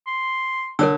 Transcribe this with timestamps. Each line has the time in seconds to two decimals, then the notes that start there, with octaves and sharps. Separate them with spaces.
0.07 C6
0.79 D3 A#4 C#5 E6